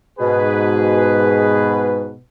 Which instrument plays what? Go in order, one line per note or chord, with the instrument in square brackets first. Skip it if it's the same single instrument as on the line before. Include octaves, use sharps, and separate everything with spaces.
[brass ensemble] G#2 G#4 B4 [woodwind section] B2